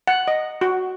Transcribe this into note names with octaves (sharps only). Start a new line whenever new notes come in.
F#5
D#5
F#4